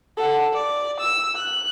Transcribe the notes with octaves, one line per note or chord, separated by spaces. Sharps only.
A4 F#5
D5
E6
F#6